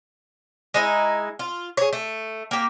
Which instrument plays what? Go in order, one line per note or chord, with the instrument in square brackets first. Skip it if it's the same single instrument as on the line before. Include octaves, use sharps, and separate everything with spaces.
[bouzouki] G#3 D#4 E4
F4
G#4 C#5
A3
A#3 G4